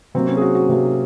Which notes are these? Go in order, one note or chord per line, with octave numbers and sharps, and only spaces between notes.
C3 F#3 A#3 C4
C#4
G#4
F#4
F#4
C3 F#3 A#3